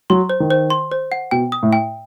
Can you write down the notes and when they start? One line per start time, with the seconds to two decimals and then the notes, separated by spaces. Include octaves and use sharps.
0.10 F#3 C6
0.30 C5
0.40 D#3
0.50 C5
0.70 C6
0.92 C5
1.12 F#5
1.31 B2 G5
1.52 D#6
1.63 A2
1.73 G5